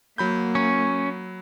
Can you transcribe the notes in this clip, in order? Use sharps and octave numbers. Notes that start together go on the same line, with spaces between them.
F#3 A#3 B5 G6
C#4